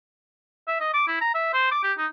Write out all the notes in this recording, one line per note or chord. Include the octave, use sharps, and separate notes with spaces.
E5
D#5
D6
E4
A#5
E5
C5
D6
G4
D#4